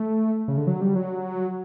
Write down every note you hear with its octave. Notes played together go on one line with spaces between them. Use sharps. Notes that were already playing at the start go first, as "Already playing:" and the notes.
Already playing: A3
C#3
D3
F#3
G3
F#3